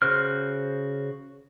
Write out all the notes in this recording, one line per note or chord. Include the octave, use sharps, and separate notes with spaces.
C#3 F#4 C5 F6